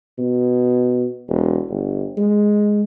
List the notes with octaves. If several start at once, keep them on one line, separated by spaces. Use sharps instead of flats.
B2
E1
G1
G#3